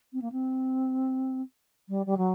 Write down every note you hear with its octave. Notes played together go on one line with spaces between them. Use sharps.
C4
A#3
C4
G3
G3
F#3